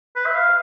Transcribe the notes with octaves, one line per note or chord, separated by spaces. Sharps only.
B4
E5
F5